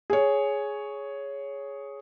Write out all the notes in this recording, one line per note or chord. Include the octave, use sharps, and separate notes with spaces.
G#4 C#5